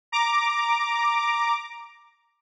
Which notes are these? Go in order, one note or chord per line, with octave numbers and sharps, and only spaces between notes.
A#5 D6